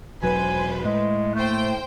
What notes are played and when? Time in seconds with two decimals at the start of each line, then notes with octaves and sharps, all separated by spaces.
0.23 E1 F#3 B4 C5 G#5
0.84 A2 G#3
1.35 A3 A#3 C5 G5